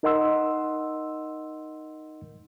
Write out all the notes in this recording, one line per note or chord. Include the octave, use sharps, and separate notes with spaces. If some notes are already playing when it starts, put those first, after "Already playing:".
D#4 A#4 D#5 F#5 C6 E6